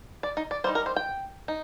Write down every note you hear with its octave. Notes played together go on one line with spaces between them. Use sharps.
D5
D#4
D5
G3 A#3 D#4 C5
A#4
C5
G5
D#4